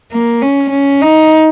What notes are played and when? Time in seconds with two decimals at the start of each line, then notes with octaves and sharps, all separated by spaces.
0.12 A#3
0.42 C#4
0.71 C#4
1.01 D#4